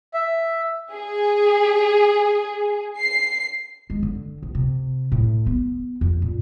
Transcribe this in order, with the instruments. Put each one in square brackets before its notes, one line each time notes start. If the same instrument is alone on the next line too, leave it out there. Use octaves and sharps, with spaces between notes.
[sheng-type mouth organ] E5
[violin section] G#4
C7
[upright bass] G#3
D3
A#1
C3
A2
B3
F2
A#2